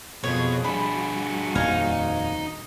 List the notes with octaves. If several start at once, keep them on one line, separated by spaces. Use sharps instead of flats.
F2 B2 G#4 C#5
G3 D4 F#4 G#4 B5
D#1 F2 D#4 F5 G#5